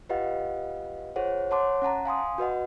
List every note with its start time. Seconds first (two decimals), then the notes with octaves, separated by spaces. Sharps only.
0.09 F4 G4 B4 D#5 F5 F#5
1.16 F4 G#4 C5 C#5 F#5
1.51 C#5 F#5 A5 C6 D6
1.82 C#4 F#5 A5 A#5
2.06 F5 G#5 C6 D#6
2.38 F#4 B4 D#5 F#5